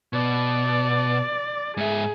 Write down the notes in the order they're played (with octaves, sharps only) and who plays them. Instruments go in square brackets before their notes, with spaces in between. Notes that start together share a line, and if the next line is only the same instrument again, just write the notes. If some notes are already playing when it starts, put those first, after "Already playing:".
[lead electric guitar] B2 [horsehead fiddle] D5
[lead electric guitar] G#2 E5 [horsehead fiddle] G#4